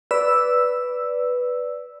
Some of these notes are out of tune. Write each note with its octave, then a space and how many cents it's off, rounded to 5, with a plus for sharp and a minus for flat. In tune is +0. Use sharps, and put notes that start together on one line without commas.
B4 +0 D5 -10 E6 +0